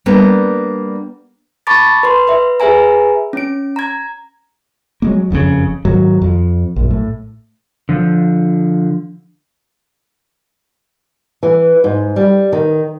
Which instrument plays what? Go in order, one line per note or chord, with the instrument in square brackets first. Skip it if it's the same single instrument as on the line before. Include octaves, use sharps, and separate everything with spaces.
[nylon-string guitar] G3 A#3 B3 D4
[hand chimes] A5 B5 C#6 D6 A6
B4 C6
B4 E5
G#4 B4 E5 G#5 A#5
C#4 D7
A#5 G#6
[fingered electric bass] F#3 G#3 A#3
F#1 F2 A#2 C#3
G#2 D#3 F#3
F2
A#1 F#2
A2
[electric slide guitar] D3 F3
[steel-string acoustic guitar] E3
G#2
G3
D#3